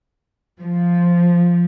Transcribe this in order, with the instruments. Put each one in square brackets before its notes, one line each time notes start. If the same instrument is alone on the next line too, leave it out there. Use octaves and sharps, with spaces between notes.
[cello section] F3